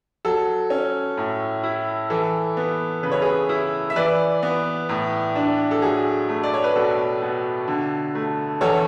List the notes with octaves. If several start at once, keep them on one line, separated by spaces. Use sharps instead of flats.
F#3 A4
C#4
A2
E4
E3 A4
B3
C#3 B4
C#5
G#4 B4
E4
E5
E3 B4 D5
B3
A2
D4
A4
F#3 G#4
A3
D5
C#5
B4
B2 A4
B2
D3
A3
E2 A4 C#5